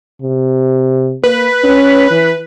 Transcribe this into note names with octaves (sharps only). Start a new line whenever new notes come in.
C3
A#3 B4
C#4
E3